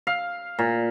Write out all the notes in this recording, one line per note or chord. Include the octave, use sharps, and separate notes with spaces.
F5
A#2